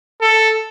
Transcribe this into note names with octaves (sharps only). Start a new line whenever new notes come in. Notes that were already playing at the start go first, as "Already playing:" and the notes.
A4